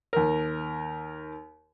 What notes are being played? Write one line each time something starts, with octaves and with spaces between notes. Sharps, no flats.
D#2 A#4